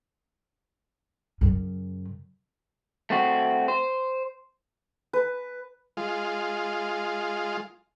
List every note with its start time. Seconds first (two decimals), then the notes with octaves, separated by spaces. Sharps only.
1.41 F#2 C#3
3.10 A3 C4 F#4
3.68 C5
5.13 B4
5.97 G#3 F4